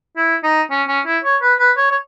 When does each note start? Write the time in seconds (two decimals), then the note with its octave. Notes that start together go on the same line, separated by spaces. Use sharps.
0.17 E4
0.43 D#4
0.71 C#4
0.88 C#4
1.06 E4
1.24 C#5
1.42 B4
1.60 B4
1.77 C#5
1.91 C#5